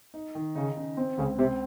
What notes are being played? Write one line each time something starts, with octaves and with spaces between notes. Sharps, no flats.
D#4
D#3
C#3 D#4
C#3
C4
C#2 C#3
C3 C4